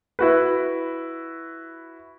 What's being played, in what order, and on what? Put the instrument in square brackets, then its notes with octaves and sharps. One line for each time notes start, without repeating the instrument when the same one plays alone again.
[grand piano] E4 F#4 B4